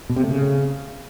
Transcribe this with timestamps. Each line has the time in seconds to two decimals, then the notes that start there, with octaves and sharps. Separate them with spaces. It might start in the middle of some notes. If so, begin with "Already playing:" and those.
0.09 B2
0.16 C3
0.23 A3
0.30 C#3